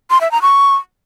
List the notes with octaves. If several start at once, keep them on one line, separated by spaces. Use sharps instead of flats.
C6
E5
A#5
C#6